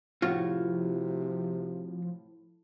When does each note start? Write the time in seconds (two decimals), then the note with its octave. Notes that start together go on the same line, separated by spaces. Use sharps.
0.22 A2 C3 F3 F4 F#4 C#5